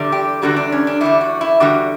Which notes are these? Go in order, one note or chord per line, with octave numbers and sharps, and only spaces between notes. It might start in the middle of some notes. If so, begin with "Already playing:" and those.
Already playing: E2 D3 G3
G4
E2 D3 G3 F#4
D4
C#4
D4
E2 D3 G3 E4
F#4
E4
E2 D3 G3 F#4